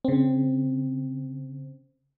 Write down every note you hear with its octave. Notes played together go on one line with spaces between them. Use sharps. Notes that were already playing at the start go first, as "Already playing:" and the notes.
C#3 C4